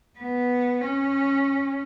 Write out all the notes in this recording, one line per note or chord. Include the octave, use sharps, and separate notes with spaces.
B3
C#4